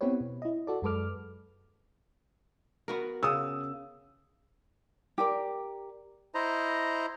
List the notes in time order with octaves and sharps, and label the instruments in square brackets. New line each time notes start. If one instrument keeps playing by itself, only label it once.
[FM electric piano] B3 C4 E4 G4 B4 C#5
B2
E4 D#5
F#4 A4 D5
F#2 G#3 A4 B4 D6 F6
[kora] B3 F#4 A#4
[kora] C#3 [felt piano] D#6 E6
[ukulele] G4 A#4 D5
[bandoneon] E4 C5 D#5 A#5